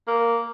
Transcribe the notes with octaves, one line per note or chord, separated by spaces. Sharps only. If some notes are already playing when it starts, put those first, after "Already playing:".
A#3